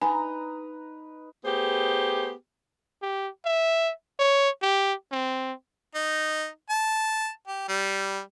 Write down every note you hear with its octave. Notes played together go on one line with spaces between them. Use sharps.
D#4 B4 G#5 A#5
A3 B3 G4 G#4 C5
G4
E5
C#5
G4
C4
D#4
A5
G4
G3